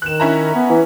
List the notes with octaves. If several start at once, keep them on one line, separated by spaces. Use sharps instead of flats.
D#3 F#6 E7
C#4 E4 A#5
B3
E3